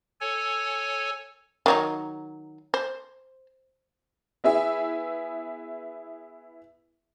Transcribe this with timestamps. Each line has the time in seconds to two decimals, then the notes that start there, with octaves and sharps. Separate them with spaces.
0.21 A4 C#5 G#5
1.66 D#3 F#3 D#4
2.74 C5
4.44 B3 E4 G#4 E5